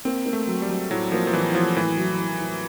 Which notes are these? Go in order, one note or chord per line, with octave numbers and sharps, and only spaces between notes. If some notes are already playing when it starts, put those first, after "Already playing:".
A#3 C4
A#3
A3
F#3
G3
F#3
A2 F#3
F3 A#3
F3
A2 E3
F3 F#3
A2 E3
F#3
F#3
A2